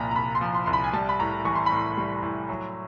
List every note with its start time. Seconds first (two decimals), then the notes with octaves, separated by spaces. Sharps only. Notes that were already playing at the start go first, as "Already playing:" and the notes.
Already playing: C2 A#2 F3 A#5 B5
0.11 A#5
0.15 C2 B5
0.35 C6
0.41 F3
0.55 C6
0.66 C2 C6
0.73 B5
0.84 G#5
0.93 G3 A5
1.09 B5
1.19 A2 A#5
1.45 E3 C#6
1.55 C6
1.66 A2 B5
1.76 C6
1.97 G3
2.23 A2
2.49 F#3